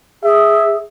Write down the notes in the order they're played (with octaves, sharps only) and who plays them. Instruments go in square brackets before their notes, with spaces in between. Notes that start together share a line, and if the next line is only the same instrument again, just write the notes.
[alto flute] G#4 [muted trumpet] E5